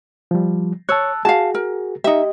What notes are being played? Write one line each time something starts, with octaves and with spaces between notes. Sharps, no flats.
F3 G3
C#5 A5 E6 F#6
F#4 G#4 F5 A5
A#4
D#4 G4 D#5 E5